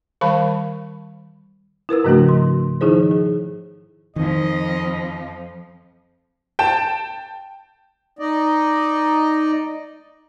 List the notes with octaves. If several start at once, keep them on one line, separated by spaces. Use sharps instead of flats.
D#3 G3 A#4 F5 A5 B5
E4 A#4 B4 E6
G#2 C#3 F3 A3 D4 F#4
C6
D#3 F3 D#4 E4 G#4 C5
G#4
F2 D#3 F3 D#5
G5 A5 E7
D#4 D5 D#5